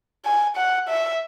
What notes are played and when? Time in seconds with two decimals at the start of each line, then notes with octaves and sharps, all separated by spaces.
0.25 G#5
0.56 F#5
0.88 E5